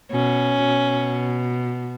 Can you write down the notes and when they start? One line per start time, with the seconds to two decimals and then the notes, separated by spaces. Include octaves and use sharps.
0.11 B2 C#4
0.66 B2